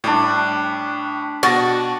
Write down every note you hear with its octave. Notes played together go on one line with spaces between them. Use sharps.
A2 G3 D4
B2 F#4 A6 A#6